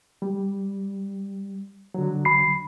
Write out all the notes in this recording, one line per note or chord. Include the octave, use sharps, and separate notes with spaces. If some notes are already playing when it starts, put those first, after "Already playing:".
G3
D3 F#3
B5 C7